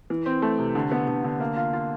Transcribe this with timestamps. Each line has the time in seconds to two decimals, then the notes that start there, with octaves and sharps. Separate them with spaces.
0.10 E3
0.26 C4
0.42 A3
0.58 C3
0.75 D3
0.91 B3
1.08 D3
1.24 D3
1.40 A#3
1.57 F4
1.73 F4